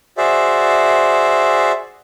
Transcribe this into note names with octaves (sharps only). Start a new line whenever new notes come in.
F#4 G#4 C5 D5 E5